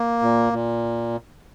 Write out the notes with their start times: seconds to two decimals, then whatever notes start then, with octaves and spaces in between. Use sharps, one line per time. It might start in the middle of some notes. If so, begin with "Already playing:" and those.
Already playing: A#3
0.22 A#2
0.53 A#2